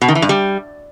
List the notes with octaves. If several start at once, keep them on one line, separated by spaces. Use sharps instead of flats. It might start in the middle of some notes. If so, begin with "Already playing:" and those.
B2
D#3
E3
G2
G3